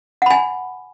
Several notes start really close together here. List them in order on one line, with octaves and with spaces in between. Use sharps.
F#5 B5 G#5